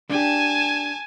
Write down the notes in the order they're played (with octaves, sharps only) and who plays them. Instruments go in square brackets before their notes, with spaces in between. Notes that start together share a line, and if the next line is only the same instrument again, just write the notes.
[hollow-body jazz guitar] D4 G4 [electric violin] G#5 A5